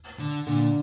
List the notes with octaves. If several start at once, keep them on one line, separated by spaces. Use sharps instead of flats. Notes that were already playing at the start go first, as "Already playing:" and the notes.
D3
A#2 D3